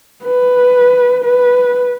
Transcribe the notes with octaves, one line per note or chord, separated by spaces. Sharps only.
B4
B4